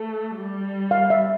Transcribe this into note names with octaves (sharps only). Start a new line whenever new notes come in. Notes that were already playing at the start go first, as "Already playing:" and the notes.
Already playing: A3
G3
F5
E5